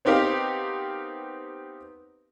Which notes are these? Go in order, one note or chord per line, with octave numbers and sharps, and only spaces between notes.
B3 C4 D#4 G4 A#4 F5